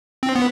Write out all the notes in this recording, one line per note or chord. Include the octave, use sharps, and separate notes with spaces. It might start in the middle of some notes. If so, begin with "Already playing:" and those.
C4
B3